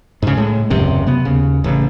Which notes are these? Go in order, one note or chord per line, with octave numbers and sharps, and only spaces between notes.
G#2 C#3
A2 G#3
D#1 C#2 F#2 C3
C3 B3
D#2 C#3
A1 C#3